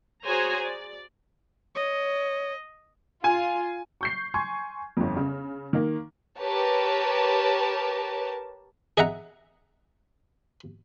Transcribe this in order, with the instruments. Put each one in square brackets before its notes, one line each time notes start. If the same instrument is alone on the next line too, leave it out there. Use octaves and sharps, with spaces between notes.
[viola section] F#4 G#4 C5 C#5 G#5 A#5
D5
[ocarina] C#5 [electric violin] D#5
[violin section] F4 [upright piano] G#5
[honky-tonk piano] C#6 G6 C7
G#5 C6 C#6 G#6
G1 F2
C#3
D#3 A#3
[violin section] G4 A#4 B4 C#5 A5
[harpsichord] G#4 D#5 E5 F#5 A#5